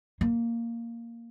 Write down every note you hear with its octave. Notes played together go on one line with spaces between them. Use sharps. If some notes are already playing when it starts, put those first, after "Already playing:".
A#3